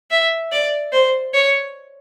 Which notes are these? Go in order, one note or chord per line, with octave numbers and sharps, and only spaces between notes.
E5
D5
C5
C#5